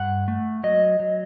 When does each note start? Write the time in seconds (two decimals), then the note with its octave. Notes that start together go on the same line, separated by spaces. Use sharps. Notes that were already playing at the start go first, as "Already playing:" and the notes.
Already playing: G2 F#5
0.28 A3
0.64 F#3 D#5
1.00 F#3